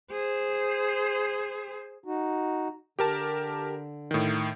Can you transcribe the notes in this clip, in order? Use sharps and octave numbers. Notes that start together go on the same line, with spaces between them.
G#4 C5
D#4 F#4
D3 G4 A#4 A5
A2 D#3